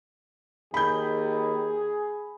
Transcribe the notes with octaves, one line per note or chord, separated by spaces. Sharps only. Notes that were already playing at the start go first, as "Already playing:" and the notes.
D#2 G#4 B5 G6